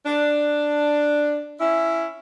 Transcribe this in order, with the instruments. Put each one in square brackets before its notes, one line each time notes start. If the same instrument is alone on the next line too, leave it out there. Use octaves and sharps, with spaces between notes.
[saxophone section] D4
C#4 E4